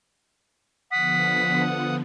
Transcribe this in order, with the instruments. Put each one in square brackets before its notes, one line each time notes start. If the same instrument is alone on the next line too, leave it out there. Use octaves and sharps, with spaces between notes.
[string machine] D3 F3 B3 [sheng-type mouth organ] F#5 D#6 [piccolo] B6